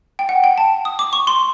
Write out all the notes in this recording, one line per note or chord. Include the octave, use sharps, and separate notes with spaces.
G5
F#5
G5
A5
D#6
D6
C#6
C6